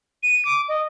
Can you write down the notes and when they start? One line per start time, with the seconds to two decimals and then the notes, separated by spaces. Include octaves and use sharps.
0.23 D#7
0.45 D6
0.69 D#5